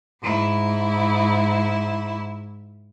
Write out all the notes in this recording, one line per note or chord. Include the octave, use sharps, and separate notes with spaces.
G#2 E4